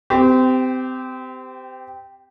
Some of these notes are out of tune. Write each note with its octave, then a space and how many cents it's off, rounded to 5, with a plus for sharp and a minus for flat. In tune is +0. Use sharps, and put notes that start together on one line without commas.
C4 -30 G4 +0